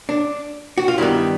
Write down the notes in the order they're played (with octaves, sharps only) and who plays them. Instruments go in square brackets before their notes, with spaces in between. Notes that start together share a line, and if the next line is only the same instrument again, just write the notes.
[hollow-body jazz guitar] D4
F#4
F4
G2 D#3 G3 B3 E4